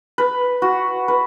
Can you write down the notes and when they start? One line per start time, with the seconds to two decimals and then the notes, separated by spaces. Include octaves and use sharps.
0.18 B4
0.62 F#4
1.08 B4